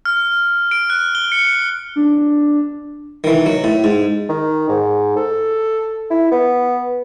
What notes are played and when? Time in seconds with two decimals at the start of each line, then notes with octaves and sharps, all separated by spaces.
0.05 F6
0.71 D7
0.90 F#6
1.15 G7
1.32 C#7
1.96 D4
3.24 D#3 E3
3.46 F#3
3.64 A2
3.84 G#2
4.29 D#3
4.69 G#2
5.17 A4
6.11 E4
6.32 B3